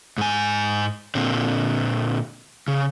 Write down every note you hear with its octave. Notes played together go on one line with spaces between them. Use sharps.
G#2 G#5
A#2 D3 C4
C#3